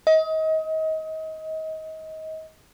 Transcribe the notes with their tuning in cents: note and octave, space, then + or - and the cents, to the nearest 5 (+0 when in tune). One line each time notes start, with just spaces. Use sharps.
D#5 +30